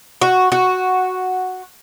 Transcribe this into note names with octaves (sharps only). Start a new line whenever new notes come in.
F#4
F#4